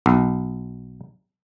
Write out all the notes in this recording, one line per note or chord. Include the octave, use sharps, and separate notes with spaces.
B1